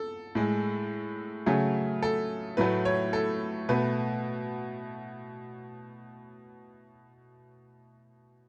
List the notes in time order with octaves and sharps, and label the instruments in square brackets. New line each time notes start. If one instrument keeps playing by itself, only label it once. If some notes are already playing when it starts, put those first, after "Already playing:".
Already playing: [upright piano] A4
A2 G#3
C#3 F#3 A3 G#4
A4
A2 F#3 A3 B4
C#5
A4
B2 A3 B4